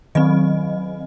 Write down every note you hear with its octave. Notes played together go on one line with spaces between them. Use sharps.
D#3 F#3 C4 D#5